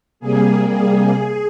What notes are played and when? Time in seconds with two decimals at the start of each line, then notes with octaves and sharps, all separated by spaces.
0.20 C3 G3 A#3 G#4
0.66 G#4